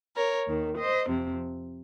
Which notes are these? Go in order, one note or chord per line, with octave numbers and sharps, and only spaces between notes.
A#4 C#5
D#2 D#3
C5 D#5
F2 C3 F3